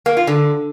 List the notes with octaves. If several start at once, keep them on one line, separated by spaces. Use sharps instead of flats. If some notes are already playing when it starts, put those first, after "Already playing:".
A#3
F4
D3